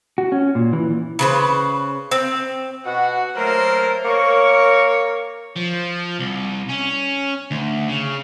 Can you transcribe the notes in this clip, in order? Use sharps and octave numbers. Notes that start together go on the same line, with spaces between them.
F#4
C#4
A#2
E3
C#3 B4 C5
C4
B2 F#4 F#5
F#3 A3 A#3 A#4 C5
A#3 A#4 C#5 C#6
F3
C2
C#4
D2
C#3